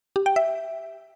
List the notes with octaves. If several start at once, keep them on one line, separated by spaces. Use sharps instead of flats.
G4
G5
E5